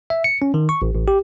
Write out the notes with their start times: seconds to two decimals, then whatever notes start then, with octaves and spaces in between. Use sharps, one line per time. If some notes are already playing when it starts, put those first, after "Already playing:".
0.10 E5
0.24 C#7
0.42 C#4
0.54 D#3
0.69 C#6
0.82 A1
0.94 A1
1.08 G4